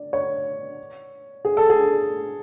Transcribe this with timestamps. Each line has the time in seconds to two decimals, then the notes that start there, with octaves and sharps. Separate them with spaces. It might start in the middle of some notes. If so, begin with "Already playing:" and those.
Already playing: D5
0.13 C#5
1.45 G#4
1.57 A4
1.70 G#4